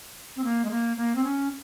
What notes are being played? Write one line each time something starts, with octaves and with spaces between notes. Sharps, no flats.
C4
A#3
G#3
A#3
A#3
C4
C#4